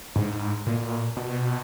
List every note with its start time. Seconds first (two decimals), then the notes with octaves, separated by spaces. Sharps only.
0.16 G#2
0.66 A#2
1.17 B2